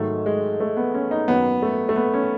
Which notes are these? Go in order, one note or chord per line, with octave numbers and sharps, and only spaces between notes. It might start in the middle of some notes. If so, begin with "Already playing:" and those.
Already playing: G#2 D#3 F#3 A3
G#3
A3
B3
C#4
D#4
F#2 D#3 F#3 B3
A3
A3
B3
C#4